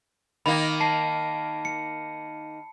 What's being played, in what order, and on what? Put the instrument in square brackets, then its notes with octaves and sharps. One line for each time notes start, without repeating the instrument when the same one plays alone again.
[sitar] D#3 A#3 [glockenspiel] B5
[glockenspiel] A5 C7
C#7